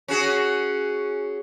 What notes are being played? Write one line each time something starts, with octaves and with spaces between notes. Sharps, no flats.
C#4 F#4 G#4